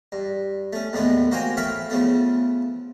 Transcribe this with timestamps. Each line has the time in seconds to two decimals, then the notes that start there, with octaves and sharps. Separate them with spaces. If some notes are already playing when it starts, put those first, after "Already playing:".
0.12 G2
0.73 A3 C#4
0.93 D#2 A2 D3 G#3 A3 B3
1.31 A#3 F#4 C5 G5 G#5 A#5
1.57 A3 C#5 F5 G5 B5
1.90 C#3 F3 A3 B3